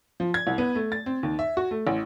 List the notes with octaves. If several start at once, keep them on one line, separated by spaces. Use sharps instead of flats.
F3
G#6
C2
B3
A3
A6
C4
D#2
E5
F#4
A3
A1